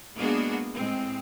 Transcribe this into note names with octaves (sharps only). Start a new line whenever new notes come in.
G#3 A#3 B3 D4 F#4 G#4
A2 G#3 C4